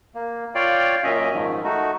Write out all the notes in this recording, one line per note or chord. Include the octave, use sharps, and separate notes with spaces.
A#3
F4 C#5 D5 F5 G5
F#2 A#2 C#4 D#5 E5
G#2 D#3 F3
A3 D#4 F#4